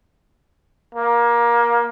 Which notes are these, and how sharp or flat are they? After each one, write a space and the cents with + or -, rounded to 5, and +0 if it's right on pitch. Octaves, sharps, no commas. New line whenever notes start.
A#3 +20